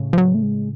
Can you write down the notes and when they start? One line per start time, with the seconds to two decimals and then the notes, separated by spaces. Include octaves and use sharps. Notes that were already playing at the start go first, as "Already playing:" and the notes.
Already playing: A2 C#3
0.13 F3
0.18 F#3
0.34 A3
0.43 G#3